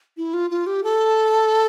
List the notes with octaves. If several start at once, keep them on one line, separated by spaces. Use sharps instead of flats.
E4
F4
F4
G4
A4